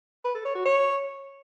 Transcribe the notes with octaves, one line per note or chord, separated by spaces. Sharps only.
B4
A4
C#5
F#4
C#5